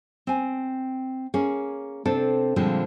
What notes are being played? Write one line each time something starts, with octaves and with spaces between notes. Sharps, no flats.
C4 G#5
A#3 C#4 G#4
C3 C4 D4 A4
A#2 D3 F3 G3 G#3 C4